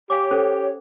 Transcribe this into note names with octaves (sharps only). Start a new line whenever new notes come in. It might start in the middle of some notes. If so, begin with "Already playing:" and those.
G4 C#5 F5 G#5 D6
C#4 A4 C5